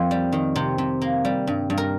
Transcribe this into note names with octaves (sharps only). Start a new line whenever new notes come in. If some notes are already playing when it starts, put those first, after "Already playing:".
Already playing: F2 A#3 F4
G3
D#3
C3
C3
A#3
G3
G2
G2
A#4